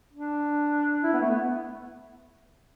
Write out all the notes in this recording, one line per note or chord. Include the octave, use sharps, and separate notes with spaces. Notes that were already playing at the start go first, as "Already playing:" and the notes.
D4
E4
B3
A3
B3